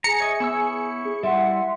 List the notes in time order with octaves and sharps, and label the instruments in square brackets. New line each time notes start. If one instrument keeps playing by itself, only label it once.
[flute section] G#4 [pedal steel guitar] A#5 [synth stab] C#7
[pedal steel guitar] C#5 D#5 [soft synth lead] E5
[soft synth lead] B3 [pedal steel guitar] E4 C#5 E6
[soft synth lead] G#4
[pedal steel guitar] G3 E4 [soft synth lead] E5 [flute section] F#5 C6